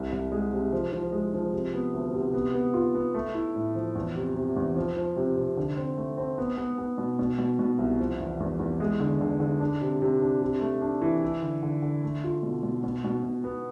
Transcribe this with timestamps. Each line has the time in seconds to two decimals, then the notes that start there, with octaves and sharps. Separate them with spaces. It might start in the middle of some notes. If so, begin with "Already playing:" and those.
Already playing: C2
0.12 C2
0.32 G#3
0.53 C3
0.72 F3
0.92 F3
1.12 G#3
1.34 F3
1.53 C3
1.74 B3
1.94 D2
2.14 C3
2.34 B3
2.54 B3
2.74 F4
2.95 B3
3.14 A3
3.34 E4
3.56 A2
3.75 F3
3.95 E2
4.16 C3
4.35 C3
4.56 E2
4.76 F3
4.96 F3
5.16 C3
5.37 C3
5.57 D3
5.77 C4
5.97 A3
6.17 C4
6.38 B3
6.57 B3
6.78 B3
6.98 B2
7.19 B2
7.38 B2
7.59 B2
7.79 C2
8.00 F3
8.20 E2
8.40 E2
8.60 E2
8.80 G#3
9.00 D3
9.21 D3
9.40 D3
9.60 D4
9.81 C3
10.02 C3
10.22 D4
10.42 C3
10.61 A3
10.82 D4
11.02 E3
11.22 E4
11.42 D3
11.63 D3
11.82 D3
12.03 A3
12.24 F4
12.43 B2
12.63 B2
12.83 B2
13.04 B2
13.24 B2
13.44 B3